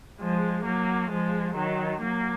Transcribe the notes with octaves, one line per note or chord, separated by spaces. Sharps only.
F3 G#3
F#3 A#3
F3 G#3
D#3 F#3
F#3 A#3